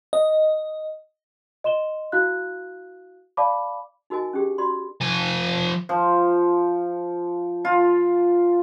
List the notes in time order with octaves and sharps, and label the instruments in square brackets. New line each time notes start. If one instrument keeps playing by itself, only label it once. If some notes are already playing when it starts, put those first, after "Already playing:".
[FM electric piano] D#5
[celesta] D#5 C6 E7 G7
E4 F#4 F5 F#6
D5 F5 A5 B5 D6
[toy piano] D#4 F#4 A#4 D#5 G#5
C#4 D4 G4 G#4
F#4 D5 B5 C6
[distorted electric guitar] F3 G#5
[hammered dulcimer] F3
F4